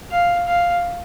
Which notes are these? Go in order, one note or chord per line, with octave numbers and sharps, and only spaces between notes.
F5
F5